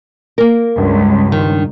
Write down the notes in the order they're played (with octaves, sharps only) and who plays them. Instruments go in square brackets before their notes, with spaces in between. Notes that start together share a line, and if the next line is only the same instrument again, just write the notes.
[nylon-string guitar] A#3 A#4
[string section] C#2 [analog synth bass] G2
[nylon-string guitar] D#3